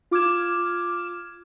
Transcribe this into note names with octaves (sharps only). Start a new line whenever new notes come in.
F4 D6 F6 G#6 E7